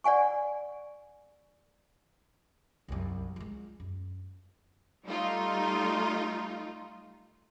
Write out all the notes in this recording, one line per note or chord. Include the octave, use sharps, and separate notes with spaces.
D5 F#5 G#5 C#6
C2 F#2
G#3 F4
F#2
G3 A3 D#4 F4